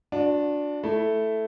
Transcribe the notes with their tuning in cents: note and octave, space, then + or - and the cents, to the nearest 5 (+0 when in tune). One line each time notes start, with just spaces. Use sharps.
D4 -5 F#4 -40
A3 +0 E4 +0